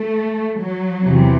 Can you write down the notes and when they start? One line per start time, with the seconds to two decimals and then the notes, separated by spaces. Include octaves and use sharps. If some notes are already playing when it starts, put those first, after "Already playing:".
Already playing: A3
0.59 F#3
1.04 E2 C3 E3